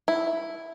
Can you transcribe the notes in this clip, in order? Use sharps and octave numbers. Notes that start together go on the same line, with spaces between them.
E4